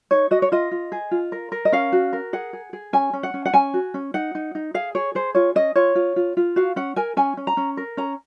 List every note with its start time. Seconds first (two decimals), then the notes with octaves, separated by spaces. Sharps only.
0.11 D#4 C#5
0.31 F#4 D#5
0.42 C#5
0.52 F4 D#5
0.71 F4
0.92 G#4
1.11 F4
1.32 A#4
1.52 A#4
1.65 D#5
1.72 C#4 F5
1.92 F#4
2.13 A#4
2.33 G#4 F#5
2.53 G#4
2.73 G#4
2.93 C#4 G#5
3.13 C#4
3.23 F#5
3.34 C#4
3.46 F#5
3.54 C#4 G#5
3.74 F#4
3.94 C#4
4.14 D#4 F#5
4.35 D#4
4.55 D#4
4.74 G#4 F5
4.95 G#4 C#5
5.15 G#4 C5
5.35 F4 C#5
5.55 C#4 D#5
5.76 F4 C#5
5.95 F4
6.16 F4
6.37 F4
6.56 F#4 F5
6.76 C#4 F#5
6.96 A#4 G#5
7.17 C#4 G#5
7.37 C#4
7.47 A#5
7.57 C#4
7.77 A#4
7.97 C#4 A#5